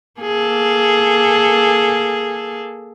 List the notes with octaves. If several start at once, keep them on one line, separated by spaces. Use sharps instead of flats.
A#3 G#4 A4